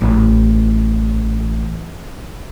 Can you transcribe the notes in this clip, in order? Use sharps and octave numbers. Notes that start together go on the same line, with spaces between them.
A1 E3